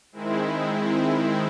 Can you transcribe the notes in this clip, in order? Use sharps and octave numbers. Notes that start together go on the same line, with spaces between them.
D#3 G#3 C4 E4